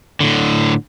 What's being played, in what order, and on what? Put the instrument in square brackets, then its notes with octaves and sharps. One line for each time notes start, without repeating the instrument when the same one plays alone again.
[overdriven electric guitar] A2 D3